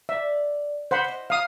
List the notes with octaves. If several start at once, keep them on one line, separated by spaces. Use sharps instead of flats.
D5 E5
C#3 B4 C5 F#5 B5
E4 D#5
F5 D#6